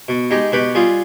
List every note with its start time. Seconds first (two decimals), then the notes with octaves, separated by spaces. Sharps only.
0.08 B2
0.31 G#3 D#4 G4
0.52 B2 G4 B4
0.75 G3 F4 G#4